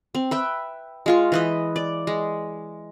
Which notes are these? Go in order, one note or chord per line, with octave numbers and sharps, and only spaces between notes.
C4
B4 E5 G5
G#3 F4 C#6
E3 B4 D#5
D5
G#3